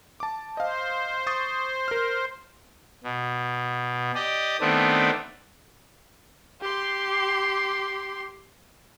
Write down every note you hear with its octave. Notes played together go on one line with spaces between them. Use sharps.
A5 D6
C5 D#5 F5
C#6 D#6 A6
A#4 F6
B2
G4 D5 D#5
D#3 A3 B3 C4 D4
G4 C6